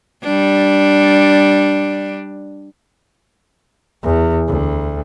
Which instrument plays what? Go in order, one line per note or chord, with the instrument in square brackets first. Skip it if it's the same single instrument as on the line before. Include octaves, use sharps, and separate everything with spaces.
[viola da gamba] G3 D4
[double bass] E2
D2